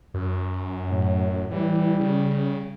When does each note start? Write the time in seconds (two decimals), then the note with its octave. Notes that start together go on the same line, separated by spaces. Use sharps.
0.14 F#2
0.88 A2 F#3
1.51 E3 G3
2.00 C#3